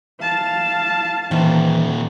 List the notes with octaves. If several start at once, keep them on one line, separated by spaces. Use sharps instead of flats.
F5 A5
A#2 D#3 E3 C5